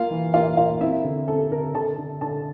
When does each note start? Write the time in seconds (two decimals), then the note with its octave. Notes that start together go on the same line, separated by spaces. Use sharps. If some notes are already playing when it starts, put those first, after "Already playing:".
Already playing: A#3 F4 F5
0.11 E3
0.34 A#3 F4 F5
0.57 A#3 F4 F5
0.81 C4 E4 E5
1.04 D3
1.27 C4 A4
1.51 D3 A#4
1.74 D3 A4 A5
1.98 D3
2.21 D3 A4 A5